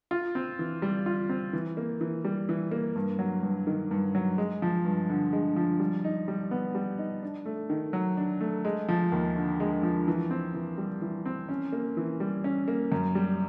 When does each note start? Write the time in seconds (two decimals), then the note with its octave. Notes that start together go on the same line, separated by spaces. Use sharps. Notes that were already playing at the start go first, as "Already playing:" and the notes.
0.11 F4
0.35 C4
0.59 E3
0.82 G3
1.06 F4
1.29 C4
1.53 E3
1.77 A#3
2.01 E3
2.25 G3
2.49 E3
2.71 A#3
2.95 G2
3.19 F#3
3.43 G2
3.67 D#3
3.91 G2
4.15 F#3
4.38 G#3
4.62 F3
4.85 G2
5.10 D3
5.33 G#3
5.56 F3
5.80 G3
6.04 D#4
6.28 G3
6.51 B3
6.75 G3
6.98 D#4
7.23 D4
7.46 A3
7.70 D#3
7.93 F#3
8.17 D4
8.41 A3
8.65 G#3
8.88 F3
9.12 D#2
9.36 D3
9.60 G#3
9.83 F3
10.08 E3
10.31 C4
10.54 E3
10.78 G3
11.02 E3
11.26 C4
11.49 C#4
11.72 A#3
11.97 E3
12.20 G3
12.44 C#4
12.68 A#3
12.92 F#2
13.15 G3